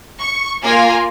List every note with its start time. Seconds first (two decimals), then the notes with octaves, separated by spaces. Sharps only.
0.19 C#6
0.63 A#3 F4 A#4 G#5